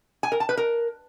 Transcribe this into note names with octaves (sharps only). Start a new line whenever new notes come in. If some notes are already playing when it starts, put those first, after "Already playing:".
G#5
A#4
A5
B4
A#4